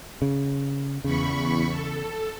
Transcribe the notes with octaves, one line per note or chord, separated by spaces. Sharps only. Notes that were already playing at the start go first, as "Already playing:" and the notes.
C#3
E2 C#3 B5 C#6
A4